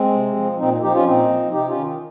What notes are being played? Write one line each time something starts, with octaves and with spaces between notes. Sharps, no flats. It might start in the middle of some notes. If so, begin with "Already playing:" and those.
Already playing: G#3 C4
C3
F3
A#2 C4 D#4
F3 D#4 G4
C#4 F4
A#2 C4 D#4
F3
C3 D#4 G4
C#4 F4
D#3